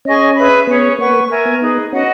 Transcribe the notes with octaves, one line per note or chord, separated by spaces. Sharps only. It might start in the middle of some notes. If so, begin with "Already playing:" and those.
C#4 G#4 D#5 G#5 C#6
G#4 B4 E5 B5
B3 C#4 G#4 C#5
A#3 B4 F#5 C#6
A#4 E5 G#5
B3
D#4 G#4 B4
C#4 F#4 B4 D#5 F#5